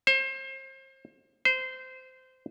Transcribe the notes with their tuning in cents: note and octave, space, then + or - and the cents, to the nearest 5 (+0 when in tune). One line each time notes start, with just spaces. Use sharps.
C5 +35
C5 -15